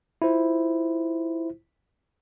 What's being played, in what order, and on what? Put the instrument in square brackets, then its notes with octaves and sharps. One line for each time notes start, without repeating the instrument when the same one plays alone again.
[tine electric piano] E4 F4 C5